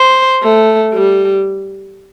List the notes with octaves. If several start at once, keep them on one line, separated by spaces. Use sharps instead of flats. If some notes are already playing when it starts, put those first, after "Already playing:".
Already playing: C5
A3
G3